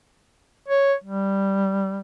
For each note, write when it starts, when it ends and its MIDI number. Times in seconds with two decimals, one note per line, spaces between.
0.68 0.94 73
1.04 2.00 55